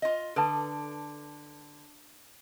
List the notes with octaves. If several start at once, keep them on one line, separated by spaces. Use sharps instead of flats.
F4 D#5
D3 A4 B4 A5